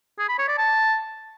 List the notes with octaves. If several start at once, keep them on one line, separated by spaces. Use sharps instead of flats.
G#4
B5
C#5
D5
A5